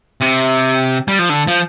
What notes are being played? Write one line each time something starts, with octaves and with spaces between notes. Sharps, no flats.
C3
G3
F3
D3
F3